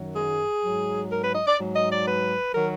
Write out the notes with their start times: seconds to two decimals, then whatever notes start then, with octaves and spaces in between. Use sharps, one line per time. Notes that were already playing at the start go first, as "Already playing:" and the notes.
Already playing: F#2 D#3 F#3
0.15 G#4
0.63 G#2 F#3
1.10 A#4
1.22 B4
1.33 D#5
1.47 D5
1.58 G#2 F#3
1.74 D#5
1.90 D5
2.05 B4
2.54 D#3 F#3 A#4